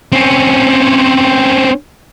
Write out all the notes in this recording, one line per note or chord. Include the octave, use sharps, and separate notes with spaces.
C4 C#4